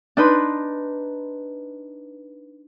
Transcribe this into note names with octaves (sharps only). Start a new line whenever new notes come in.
D4 D#4 B4 C6